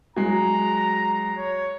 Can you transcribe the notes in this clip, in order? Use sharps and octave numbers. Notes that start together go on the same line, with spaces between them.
F#3 G#3 A#5
C#5